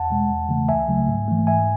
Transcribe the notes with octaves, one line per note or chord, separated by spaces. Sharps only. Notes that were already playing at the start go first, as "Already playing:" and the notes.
Already playing: E2 F#5 A5
B2 G#3
E2
C#3 E3 A3
C#2 E5 G#5
C#3 F#3 A3
G#2
E3 A3
G#2 E5 G#5